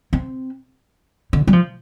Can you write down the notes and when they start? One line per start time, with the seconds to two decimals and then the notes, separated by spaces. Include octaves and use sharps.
0.13 C4
1.33 D3
1.47 G3
1.53 F3